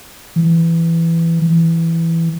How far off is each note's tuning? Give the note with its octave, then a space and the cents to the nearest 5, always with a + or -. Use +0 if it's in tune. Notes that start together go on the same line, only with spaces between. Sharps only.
E3 +10
E3 +5